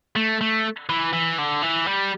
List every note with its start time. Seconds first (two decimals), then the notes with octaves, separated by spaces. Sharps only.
0.16 A3
0.41 A3
0.89 E3
1.13 E3
1.38 D3
1.62 E3
1.87 G3